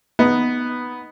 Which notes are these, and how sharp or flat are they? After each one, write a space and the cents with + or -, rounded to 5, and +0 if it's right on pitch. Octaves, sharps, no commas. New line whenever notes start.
B3 +0 D#4 +0